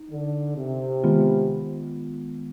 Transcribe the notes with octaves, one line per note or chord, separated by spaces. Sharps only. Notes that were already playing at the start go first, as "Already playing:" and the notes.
Already playing: D#4
D3
C3
D#3 G#3 B3 F4